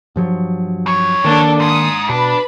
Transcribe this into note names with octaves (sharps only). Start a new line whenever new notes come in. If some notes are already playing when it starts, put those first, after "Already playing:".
G2 F3 F#3
F2 C#5
D#3 A#3 D4 A4
G#2 D#6
B2 D4 B4 B5